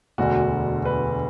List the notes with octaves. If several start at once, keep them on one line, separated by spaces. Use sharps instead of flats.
E1 D2 D3 F#4
B4